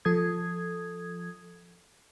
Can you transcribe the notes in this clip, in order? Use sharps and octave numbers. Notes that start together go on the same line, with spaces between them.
F3 A4 D#6 G#6